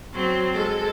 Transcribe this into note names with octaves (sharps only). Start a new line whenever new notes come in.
F#3 C4
G#3 A4